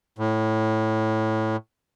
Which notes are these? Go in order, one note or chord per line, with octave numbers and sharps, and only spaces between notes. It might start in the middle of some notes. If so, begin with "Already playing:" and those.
A2